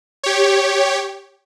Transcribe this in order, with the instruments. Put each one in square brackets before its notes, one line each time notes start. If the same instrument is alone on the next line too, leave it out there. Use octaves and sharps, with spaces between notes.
[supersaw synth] G4 C#5